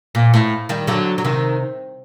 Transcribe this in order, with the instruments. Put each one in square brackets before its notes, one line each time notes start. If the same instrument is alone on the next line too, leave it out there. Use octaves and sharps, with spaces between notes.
[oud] A#2
A2
D#3 G3
D3 F#3
F#3
C3 D#3